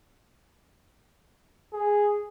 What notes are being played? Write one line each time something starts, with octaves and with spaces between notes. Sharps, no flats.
G#4